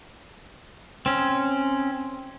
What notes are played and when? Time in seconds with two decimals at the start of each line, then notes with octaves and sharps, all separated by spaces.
1.06 C4 C#4